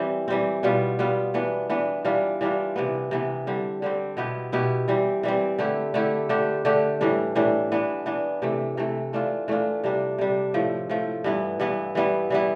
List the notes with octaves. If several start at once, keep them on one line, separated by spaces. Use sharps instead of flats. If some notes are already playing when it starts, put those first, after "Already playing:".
Already playing: E3 G3 C4
E3 G3 C4
B2 G3 B3 F4
B2 G3 B3 F4
E3 B3 D4
E3 B3 D4
E3 G3 D4 F4
E3 G3 D4 F4
C3 E3 B3
C3 E3 B3
D3 G3 C4
D3 G3 C4
B2 B3 E4 G4
B2 B3 E4 G4
E3 G3 C4
E3 G3 C4
D3 A3 E4 G4
D3 A3 E4 G4
D3 A3 D4 G4
D3 A3 D4 G4
A2 E3 G3 D4
A2 E3 G3 D4
E3 B3 D4
E3 B3 D4
C3 E3 A3
C3 E3 A3
E3 A3 D4 F4
E3 A3 D4 F4
C3 G3 D4
C3 G3 D4
A2 F3 A3
A2 F3 A3
G2 E3 B3 E4
G2 E3 B3 E4
E3 G3 B3 E4
E3 G3 B3 E4